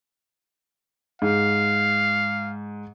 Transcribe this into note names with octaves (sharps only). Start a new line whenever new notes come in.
G#2 F5